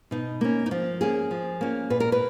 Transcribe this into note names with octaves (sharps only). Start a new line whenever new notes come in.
B2 D#4
A#3 C#4
D#4
F3 F4
A#3 C#4 G#4
F3
A#3 C#4
A#2 B4
A#4
B4